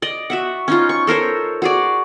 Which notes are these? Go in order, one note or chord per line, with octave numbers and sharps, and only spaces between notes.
D5 D#5
F#4 E5 F#5
C#4 D#4 F4
C#6
A4 A#4 C5 C#5
F#4 G#4 D5